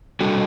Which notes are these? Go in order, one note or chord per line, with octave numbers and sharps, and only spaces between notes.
G3 D4 F#4 A4